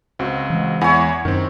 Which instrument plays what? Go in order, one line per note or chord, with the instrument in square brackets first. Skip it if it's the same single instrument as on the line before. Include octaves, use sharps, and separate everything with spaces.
[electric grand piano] C#2 C4 F#4
[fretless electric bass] E3 G#3
[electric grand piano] E2 F#5 G#5 [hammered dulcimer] E4 C#5
[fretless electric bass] F#2 [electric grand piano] D#3 C4